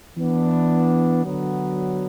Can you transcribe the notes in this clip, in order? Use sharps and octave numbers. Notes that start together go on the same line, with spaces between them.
E3 B3 D4
D3 F#3 B3